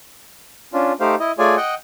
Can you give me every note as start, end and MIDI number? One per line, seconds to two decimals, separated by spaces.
0.73 0.93 61
0.73 0.93 62
0.73 0.93 65
1.00 1.15 57
1.00 1.15 63
1.00 1.15 67
1.00 1.15 72
1.00 1.15 77
1.20 1.32 64
1.20 1.32 75
1.39 1.56 57
1.39 1.56 65
1.39 1.56 68
1.39 1.56 73
1.39 1.56 74
1.39 1.56 80
1.57 1.75 75
1.57 1.75 78
1.57 1.75 79